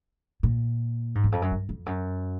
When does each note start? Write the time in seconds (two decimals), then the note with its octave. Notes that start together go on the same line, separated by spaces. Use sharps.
0.43 A#2
1.15 G#2
1.24 E2
1.32 F2
1.42 F#2
1.51 G2
1.69 F2
1.86 F#2